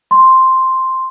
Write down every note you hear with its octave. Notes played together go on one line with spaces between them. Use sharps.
C6